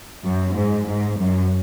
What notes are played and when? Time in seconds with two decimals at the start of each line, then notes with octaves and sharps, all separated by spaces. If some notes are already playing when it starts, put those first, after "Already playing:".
0.24 F#2
0.55 G#2
0.88 G#2
1.19 F#2